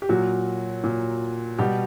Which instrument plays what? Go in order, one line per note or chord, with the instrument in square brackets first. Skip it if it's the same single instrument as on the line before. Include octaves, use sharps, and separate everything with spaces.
[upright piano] G4
A#2 F#3 F#4
A#2
B2 G3 G4